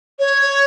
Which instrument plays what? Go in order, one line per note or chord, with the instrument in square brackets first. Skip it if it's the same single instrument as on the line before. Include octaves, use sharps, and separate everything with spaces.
[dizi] C#5